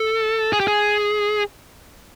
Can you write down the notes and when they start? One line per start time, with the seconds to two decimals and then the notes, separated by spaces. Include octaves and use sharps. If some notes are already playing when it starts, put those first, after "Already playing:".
Already playing: A4
0.53 G#4
0.60 G4
0.68 G#4